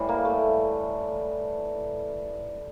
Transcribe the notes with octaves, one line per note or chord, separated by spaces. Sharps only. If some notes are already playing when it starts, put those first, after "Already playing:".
Already playing: A2 E3 G3
A#3
A3